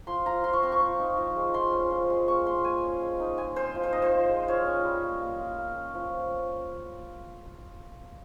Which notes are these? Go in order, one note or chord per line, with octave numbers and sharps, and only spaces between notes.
F3 C6
F4 A#5
F3 C6
C#6
C4 C6
C#6
F3
D#4
F3
G#3
F3 C6
C#4
F3
G#3
A#3 C#6
F4 C6
A#3 G#5
C#4
G#3
D#4
G#3 G#5
C4 C5
F3
C5
D#4 D#5
C5
F3
G#3
F4 C#5
C#4
G3
A#3
A#3
F4
A#3
C#4
F3